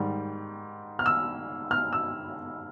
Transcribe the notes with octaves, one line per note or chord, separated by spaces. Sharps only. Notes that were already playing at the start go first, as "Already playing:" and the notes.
Already playing: G#2 D#3 G3
F6
E6
F6
E6